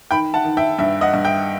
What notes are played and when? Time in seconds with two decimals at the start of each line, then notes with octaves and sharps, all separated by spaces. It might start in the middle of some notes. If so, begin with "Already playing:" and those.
0.11 D#3 G5 B5
0.34 F#5 A5
0.45 D#3
0.57 E5 G5
0.79 G2 E5
1.01 D#5 F#5
1.14 G2
1.25 E5 G5